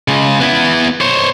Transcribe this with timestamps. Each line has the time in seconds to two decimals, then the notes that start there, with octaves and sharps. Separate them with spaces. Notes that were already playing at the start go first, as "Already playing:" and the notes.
0.08 C#3 G#3
0.40 B3 E4
1.01 C5 C#5